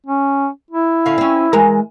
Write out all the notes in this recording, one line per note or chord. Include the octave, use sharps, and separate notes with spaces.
C#4
E4
D3 C#4 F5
C4 C#4
E3 G#3 A#4